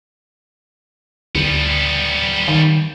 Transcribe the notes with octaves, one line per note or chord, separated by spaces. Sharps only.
D2 G3 B3
D#3